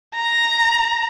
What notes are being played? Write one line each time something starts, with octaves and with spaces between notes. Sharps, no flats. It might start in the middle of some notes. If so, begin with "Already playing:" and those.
A#5